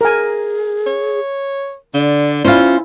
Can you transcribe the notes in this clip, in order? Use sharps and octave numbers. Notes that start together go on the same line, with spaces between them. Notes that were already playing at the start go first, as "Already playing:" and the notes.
G#4 A#4 G#5
C#5
D3 D5
C#4 E4 F4 C5